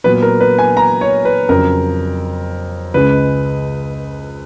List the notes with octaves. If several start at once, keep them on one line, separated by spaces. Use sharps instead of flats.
A#2 F#3 B3 B4
A#4
B4
G#5
A#5
C#5
B4
F2 C#3 F#3 A#4
C#2 C#3 G#3 B4